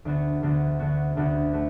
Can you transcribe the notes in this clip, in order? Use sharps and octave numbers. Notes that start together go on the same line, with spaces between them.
D2 D3 B3 F#4
D2 D3 B3 F#4
D2 D3 B3 F#4
D2 D3 B3 F#4
A3 F#4